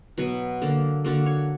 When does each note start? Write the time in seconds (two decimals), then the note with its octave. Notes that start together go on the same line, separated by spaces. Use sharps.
0.18 B2 F#3 B3
0.62 D3 A#3
1.04 D3 A#3 F#4
1.26 C#5